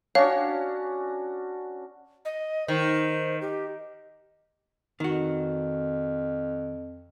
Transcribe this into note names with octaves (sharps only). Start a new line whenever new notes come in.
C#4 D4 F#4 C#5 F5
D#5
D#3 C5
G4
F2 D#3 F#4